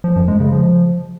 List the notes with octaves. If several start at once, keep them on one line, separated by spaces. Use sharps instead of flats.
F3
F#2
G#3
C#3
F3